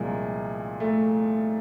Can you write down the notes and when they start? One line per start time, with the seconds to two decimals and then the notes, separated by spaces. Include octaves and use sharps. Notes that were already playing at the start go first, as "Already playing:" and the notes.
Already playing: C2 A#2 F3 G#3
0.80 A3